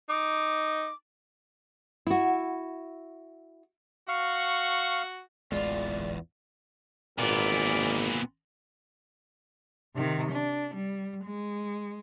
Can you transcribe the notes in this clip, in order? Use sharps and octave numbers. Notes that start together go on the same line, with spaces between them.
D#4 D6
E4 F#4
F#4 F5 C#6
D1 A1 E2 G#3 F4 D5
G#1 A#2 E3 B3 A#4 D5
C3 D#3
D4
G3
G#3